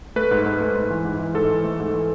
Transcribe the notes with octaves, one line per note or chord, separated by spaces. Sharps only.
A3 B4
G#2
G#2
A3
G#2
E3
G#2
E3
G#2 A4
E3
A3
G#2
E3